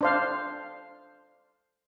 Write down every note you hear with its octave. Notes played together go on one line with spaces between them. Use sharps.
D4 C5 F5